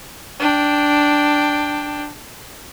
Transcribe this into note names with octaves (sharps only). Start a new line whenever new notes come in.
D4 G5